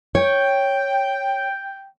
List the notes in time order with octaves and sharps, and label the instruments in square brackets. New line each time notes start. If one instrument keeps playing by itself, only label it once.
[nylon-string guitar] C#5 [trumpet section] G5